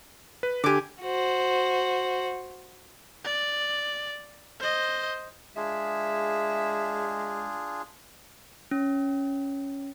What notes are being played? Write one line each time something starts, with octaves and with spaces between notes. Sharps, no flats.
B4
D3 G4 G#5 D6
F#4 C5
D5
C5 D#5
G#3 D4 F4 G#4 E5
C#4